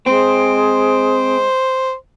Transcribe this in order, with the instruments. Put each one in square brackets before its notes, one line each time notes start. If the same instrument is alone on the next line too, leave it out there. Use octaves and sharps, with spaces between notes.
[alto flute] G#3 [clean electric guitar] C4 [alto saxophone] C5